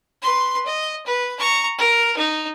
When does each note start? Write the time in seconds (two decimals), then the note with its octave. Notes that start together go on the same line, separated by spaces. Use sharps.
0.22 B4 C6
0.66 D#5
1.06 B4
1.39 A#5 C#6
1.78 A#4
2.17 D#4